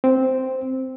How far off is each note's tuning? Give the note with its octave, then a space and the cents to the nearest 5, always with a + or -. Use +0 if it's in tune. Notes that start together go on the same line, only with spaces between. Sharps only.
C4 -5